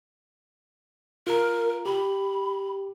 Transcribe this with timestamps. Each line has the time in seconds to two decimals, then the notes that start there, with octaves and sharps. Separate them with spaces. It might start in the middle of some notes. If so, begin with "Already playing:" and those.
1.27 F4 A#4 A#5
1.86 G4 B5